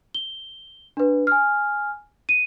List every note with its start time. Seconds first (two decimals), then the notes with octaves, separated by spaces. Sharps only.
0.14 G7
0.97 D4 B4
1.27 G#5 F6
2.29 D#7